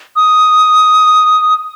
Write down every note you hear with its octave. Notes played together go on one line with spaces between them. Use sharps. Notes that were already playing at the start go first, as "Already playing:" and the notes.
D#6